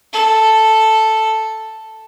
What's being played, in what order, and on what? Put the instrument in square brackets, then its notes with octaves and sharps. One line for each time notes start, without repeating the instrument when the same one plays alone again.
[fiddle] A4